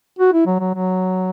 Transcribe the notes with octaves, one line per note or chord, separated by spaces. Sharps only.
F#4
E4
F#3
F#3
F#3